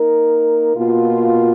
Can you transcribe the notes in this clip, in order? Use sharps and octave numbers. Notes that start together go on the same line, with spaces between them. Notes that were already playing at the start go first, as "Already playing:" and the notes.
Already playing: A#3 D#4 A#4
B2 A#3 F4